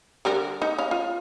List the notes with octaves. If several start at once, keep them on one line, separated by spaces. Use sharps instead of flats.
D3 G3 A#4
D#4
C#4 F5
F4